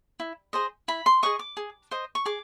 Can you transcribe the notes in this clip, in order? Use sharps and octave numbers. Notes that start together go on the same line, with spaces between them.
E4
G#4 C5 D#5
E4 B5
C6
G#4 C5 D#5 C#6
D6
G#4
C5 D#5
C#6
G#4 D6